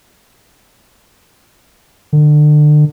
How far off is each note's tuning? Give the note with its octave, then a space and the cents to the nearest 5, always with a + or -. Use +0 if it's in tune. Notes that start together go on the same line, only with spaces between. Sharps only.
D3 +30